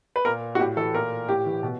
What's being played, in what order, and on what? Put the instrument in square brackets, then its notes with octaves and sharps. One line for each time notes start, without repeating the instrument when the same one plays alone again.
[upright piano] B4
A#2 A#4
F#4
A2 G4
E3 A4
A#2 A#4
A2 G4
E3
B2